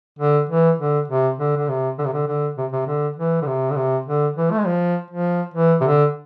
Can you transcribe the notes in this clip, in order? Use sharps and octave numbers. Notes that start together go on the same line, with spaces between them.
D3
E3
D3
C3
D3
D3
C3
D3
C3
D3
D3
C3
C3
D3
E3
D3
C3
D3
C3
D3
E3
A3
G#3
F3
F3
E3
C3
D3